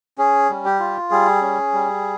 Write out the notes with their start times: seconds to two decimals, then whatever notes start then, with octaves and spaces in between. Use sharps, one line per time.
0.18 C#4 G#4
0.50 G3
0.65 G4
0.80 F4
1.11 G3 G#4
1.41 C#4
1.73 G3